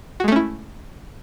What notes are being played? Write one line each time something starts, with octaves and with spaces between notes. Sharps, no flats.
G#3 A3 C#4 E4 F#4